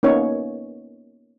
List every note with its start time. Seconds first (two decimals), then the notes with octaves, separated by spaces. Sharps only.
0.03 A#3 B3 C#4 D#4 C#5